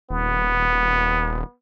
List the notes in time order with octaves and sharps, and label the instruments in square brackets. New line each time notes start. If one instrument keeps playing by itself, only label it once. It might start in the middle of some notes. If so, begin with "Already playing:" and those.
[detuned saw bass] D#1 [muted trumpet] B3